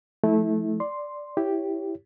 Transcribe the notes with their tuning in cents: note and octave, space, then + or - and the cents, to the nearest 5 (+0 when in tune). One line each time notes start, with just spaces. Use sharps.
F3 +0 A3 -15 E4 -25
D5 +0 C6 +0
E4 +0 G4 +0 C#5 +5